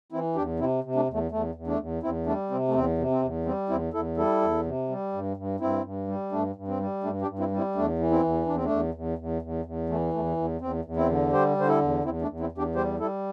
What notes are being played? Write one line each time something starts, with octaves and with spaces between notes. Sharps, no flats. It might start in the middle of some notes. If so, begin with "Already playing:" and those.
E3 C4 E4
E2 D4 G4
C3 C4 E4
C3
A3 D4
E2
A3
E2 A3
E2
A3 D4
E2
E2 C4 E4
G3 A3 D4
C3 C4
A3
E2 C4
C3
C4
E2
G3 C4
E2 C4 E4
E2 E4 A4
G3 E4 A4
E2
C3
G3
G2
G2
G2 C4 E4
G2
G3
G2 A3 D4
G2
C4
G3
G2 A3 D4
D4 G4
G2
C4 E4
G3
C4 E4
E2 A3 D4
E3
C4 E4
E2
E2 D4
C4
A3 D4
E2
E2
E2
E2
E2
E3 A3
E2 A3
E2
E2 C4
E2
C4 E4
D3
G3 G4 C5
D3 C5
E4 A4
E2
E2 C4 E4
A3 D4
E2
C4 E4
E2
D4 G4
G3 G4 C5
G3 E4 A4